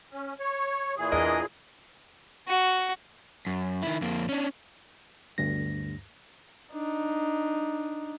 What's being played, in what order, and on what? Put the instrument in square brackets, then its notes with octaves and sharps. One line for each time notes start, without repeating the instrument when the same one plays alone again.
[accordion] C#4
C#5
A#2 E3 G#4
[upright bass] E2 [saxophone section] D4 A#4 D#5
[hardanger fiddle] F#4
[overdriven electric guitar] F#2
D#3 E4
F2 A#3
C#4 D4
[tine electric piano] G1 D2 G2 A#6
[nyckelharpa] D4 D#4